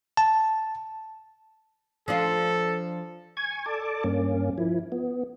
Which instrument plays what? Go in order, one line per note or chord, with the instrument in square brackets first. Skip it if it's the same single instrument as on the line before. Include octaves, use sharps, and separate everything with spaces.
[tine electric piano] A5
[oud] F3 D4 F4 [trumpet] A4
[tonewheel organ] G#5 C#6 G#6
A4 D5 A5 D6
G2 A#3 C#4
F3 E4
B3